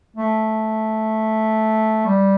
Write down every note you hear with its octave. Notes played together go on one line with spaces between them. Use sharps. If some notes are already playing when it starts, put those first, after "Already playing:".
A3
G3